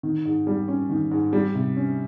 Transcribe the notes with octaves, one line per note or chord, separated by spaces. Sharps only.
D#3
G#2
G3
C#4
D#3
G#2
G3
C3
C#4